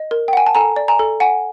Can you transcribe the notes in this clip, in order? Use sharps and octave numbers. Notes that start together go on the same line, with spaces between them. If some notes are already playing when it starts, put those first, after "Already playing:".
Already playing: D#5
A#4
G5
F#5 G#5
A5
A4 G#5 A#5
D5
G#5 A#5
A4
F#5 G#5